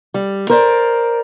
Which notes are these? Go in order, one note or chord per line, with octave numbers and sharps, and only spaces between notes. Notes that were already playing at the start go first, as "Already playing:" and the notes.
G3
A#4 C5 D5